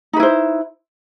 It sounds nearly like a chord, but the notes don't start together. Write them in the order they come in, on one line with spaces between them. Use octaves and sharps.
D#4 B4 E4 C5